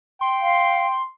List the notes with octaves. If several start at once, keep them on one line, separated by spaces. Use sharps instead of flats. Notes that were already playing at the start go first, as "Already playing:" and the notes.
G5 C6
F5